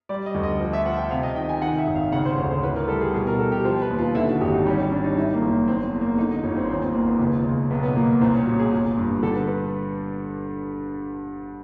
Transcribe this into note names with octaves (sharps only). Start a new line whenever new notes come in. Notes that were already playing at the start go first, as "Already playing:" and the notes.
G3 D5
D#5
D2
D#5
F3
E5
F3 F#5
G5
C3 F5
D#5
D#3 G5
G#5
D#3 F#5
E5
G#1
F5
C#3 F#5
C5
D2 C#5
C5
E3 B4
A#4
G3 A4
G#4
B2 G#4
A#4
B2 A4
G4
F3 C5
B4
D#2
F4
D3 E4
F#4
G#1 G4
D#4
G3 C#4
C#4
G3 D4
D#4
D#3 E4
A#3
F#1
E2 C4
E2
A#3
D3 D#4
D#4
G1 C#4
C4
D#2 C4
C4
D#2 A#3
B3
C#2
C#2
B1 B3
B3
A#2 A#3
C2 C4
C#4
A#2 F#4
G#4
G1
G2
D3 A4
B4
B4